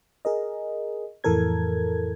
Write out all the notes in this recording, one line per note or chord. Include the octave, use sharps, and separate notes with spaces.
G#4 A#4 D#5
F2 A2 E3 A4 A#4 G#6